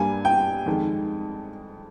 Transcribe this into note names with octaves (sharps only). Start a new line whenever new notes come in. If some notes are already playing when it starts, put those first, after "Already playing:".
Already playing: G2 G3 A#3 G#5
G5
F2 D#3 G#3